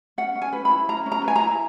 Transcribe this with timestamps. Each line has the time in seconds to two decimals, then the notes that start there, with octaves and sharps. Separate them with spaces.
0.18 C#4 F#5
0.35 C#4
0.42 G#5
0.53 B4
0.65 B5
0.70 E4
0.88 C#4 A#5
1.06 C#4
1.12 A#5
1.24 B4 G#5
1.36 A#5
1.41 E4